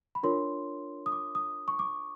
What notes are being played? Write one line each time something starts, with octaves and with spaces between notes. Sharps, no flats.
B5
D4 F4 A#4 C#5 C6
D#6
D6
D#6
C#6
D6